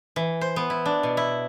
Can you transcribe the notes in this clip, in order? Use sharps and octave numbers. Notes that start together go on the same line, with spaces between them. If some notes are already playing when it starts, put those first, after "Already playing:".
E3
C5
B3
E4
D4
B2
E4